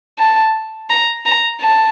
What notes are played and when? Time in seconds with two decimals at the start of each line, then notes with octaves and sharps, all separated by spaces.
0.19 A5
0.90 A#5
1.26 A#5
1.61 A5